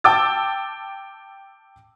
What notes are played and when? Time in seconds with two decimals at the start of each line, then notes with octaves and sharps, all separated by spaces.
0.04 G5 A5 D6 E6 A6